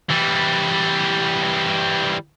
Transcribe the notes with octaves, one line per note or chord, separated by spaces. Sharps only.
E3 G3